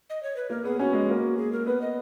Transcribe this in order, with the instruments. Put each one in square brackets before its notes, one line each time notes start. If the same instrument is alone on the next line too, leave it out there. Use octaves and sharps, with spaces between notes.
[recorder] D#5
C#5
B4
[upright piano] A#3 [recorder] A#4
[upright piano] B3 [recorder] G#4
[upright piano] C#4 [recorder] F#4
[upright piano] G#3
A#3
[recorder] G#4
A#4
[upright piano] B3 [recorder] B4
[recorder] D#5